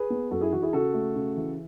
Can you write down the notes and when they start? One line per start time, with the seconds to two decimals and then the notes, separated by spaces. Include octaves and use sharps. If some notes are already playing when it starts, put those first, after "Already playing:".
Already playing: G#4 B4
0.10 B3
0.31 F#2 F#4 A4
0.41 E4 G#4
0.52 E3 F#4
0.62 E4 G#4
0.73 C#3 F#4 A4
0.94 A3
1.15 C#3
1.37 E3